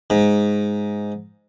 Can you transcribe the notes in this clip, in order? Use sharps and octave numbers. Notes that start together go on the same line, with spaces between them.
G#2